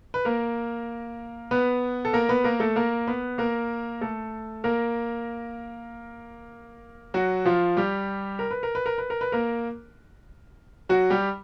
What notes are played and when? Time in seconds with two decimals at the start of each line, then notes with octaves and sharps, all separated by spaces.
0.14 B4
0.25 A#3 A#4
1.51 B3 B4
2.05 A4
2.13 A#3 A#4
2.29 B3 B4
2.44 A#3 A#4
2.60 A3 A4
2.76 A#3 A#4
3.07 B3 B4
3.38 A#3 A#4
4.01 A3 A4
4.64 A#3 A#4
7.14 F#3 F#4
7.45 F3 F4
7.77 G3 G4
8.39 A#4
8.51 B4
8.63 A#4
8.75 B4
8.86 A#4
8.98 B4
9.10 A#4
9.21 B4
9.32 A#3 A#4
10.89 F#3 F#4
11.10 G3 G4